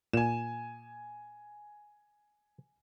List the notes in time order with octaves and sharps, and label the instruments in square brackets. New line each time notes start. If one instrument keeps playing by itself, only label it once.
[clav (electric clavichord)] A#2 [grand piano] G#5 E7